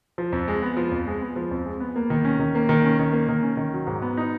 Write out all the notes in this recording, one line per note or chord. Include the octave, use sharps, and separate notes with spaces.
F3
F2
G#3
B3
F3
F2
G#3
B3
F3
F2
G#3
B3
A#3
D#3
C#4
D#3
A#3
D#3
C#4
D#3
A#3
D#3
C#4
D#3
F#3
G#2
B3
D#4